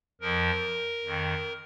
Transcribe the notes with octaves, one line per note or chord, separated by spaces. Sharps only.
F2 F3 A#4
F2 D#3